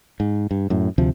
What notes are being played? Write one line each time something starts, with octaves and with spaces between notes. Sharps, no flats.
G#2
G2
F#2 A2
D2 C3 F3